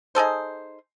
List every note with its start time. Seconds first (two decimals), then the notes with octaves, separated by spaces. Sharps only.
0.15 D#4 G#4 A4 C5